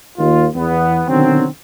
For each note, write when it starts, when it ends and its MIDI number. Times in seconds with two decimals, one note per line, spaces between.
0.17 0.46 39
0.17 0.46 65
0.55 1.02 40
0.55 1.02 59
1.08 1.46 47
1.08 1.46 50
1.08 1.46 51
1.08 1.46 54
1.08 1.46 60